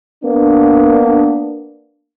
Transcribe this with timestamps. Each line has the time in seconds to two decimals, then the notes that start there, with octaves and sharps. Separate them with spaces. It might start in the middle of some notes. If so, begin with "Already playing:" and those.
0.23 A#3 B3 D4